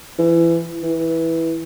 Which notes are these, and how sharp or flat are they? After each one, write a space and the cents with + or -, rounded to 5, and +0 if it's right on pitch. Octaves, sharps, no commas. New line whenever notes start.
E3 +25
E3 -10